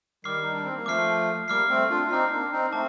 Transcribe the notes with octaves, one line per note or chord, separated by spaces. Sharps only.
D#3 G3 D6 F6 C7
D#4
D4
C4
A#3
F3 A3 D6 F6 C7
G3 A#3 D6 F6 C7
A3 C4
D4 F4
F4
C4 D#4 D6 F6 C7
A#3 D4
C4 D#4
A3 C4 A5 D6